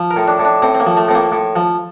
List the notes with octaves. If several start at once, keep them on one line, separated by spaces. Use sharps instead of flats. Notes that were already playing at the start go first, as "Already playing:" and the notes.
Already playing: F3
A#4
A2
D4
A2
D4
A2 C4
C4
A#3
F3
A3
A2 C4
A#3
A2
F3